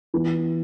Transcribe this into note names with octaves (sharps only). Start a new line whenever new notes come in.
E3 B3